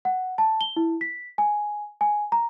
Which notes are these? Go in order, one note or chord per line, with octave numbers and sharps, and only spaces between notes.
F#5
A5
G7
E4
B6
G#5
G#5
A#5